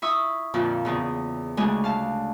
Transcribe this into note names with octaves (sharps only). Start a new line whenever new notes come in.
E4 E5 C#6 D#6 E6
F2 A#2 D3 F3
E2 C#3
D2 C#3 G#3 D4 E4 G#5
F5 A5